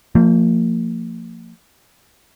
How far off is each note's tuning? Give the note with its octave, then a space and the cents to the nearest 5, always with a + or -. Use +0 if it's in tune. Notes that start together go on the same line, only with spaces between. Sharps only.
F3 +0 A#3 -35